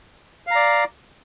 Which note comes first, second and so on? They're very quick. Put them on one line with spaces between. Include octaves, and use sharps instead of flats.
F5 A#5 D5